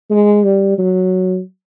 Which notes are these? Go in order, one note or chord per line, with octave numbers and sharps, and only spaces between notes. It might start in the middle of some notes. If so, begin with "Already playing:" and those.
G#3
G3
F#3